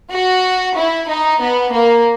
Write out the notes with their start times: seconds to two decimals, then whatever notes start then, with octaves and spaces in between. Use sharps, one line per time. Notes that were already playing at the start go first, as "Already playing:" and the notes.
0.11 F#4
0.76 E4
1.09 D#4
1.41 B3
1.73 A#3